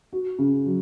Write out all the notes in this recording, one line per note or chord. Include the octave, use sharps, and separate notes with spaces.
F#4
C#3
F#3